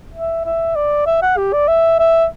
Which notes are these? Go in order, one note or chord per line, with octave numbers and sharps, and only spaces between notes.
E5
E5
D5
E5
F#5
G4
D5
E5
E5